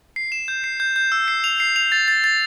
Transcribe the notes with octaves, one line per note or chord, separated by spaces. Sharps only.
C7
E7
G6
C7
G6
G6
E6
C7
F7
C7
F7
A6
A6
A6